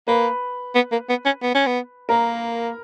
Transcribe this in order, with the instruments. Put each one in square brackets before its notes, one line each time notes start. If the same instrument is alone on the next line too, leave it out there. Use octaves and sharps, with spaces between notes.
[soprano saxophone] A#3 [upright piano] B4
[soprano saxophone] B3
A#3
B3
C#4
B3
C#4
B3
[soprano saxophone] A#3 [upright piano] A#4